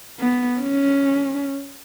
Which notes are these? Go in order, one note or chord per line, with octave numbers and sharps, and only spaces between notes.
B3
C#4